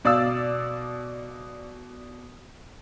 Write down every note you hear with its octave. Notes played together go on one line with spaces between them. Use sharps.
B2 D5 F5 E6